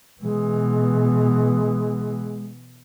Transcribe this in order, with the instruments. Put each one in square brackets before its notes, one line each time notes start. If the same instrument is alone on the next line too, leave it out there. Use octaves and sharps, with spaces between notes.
[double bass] B2 E3 [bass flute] G#3